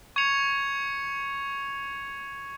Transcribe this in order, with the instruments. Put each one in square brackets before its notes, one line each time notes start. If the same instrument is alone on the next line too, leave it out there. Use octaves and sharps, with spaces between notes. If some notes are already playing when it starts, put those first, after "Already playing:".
[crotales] C#6 G#6 C#7 F7